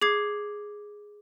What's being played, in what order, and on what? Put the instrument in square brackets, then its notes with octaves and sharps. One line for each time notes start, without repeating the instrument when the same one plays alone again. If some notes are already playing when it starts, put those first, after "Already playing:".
[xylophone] G#4 D6 G#6 C7